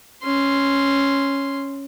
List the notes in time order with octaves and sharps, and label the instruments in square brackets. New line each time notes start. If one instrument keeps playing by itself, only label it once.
[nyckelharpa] C#4 C6